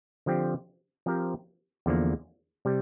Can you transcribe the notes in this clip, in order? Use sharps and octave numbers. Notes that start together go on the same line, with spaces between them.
D3 F3 C4 G4
F3 C4 G4 A#4
E2 D3 F3 A#3
C3 G3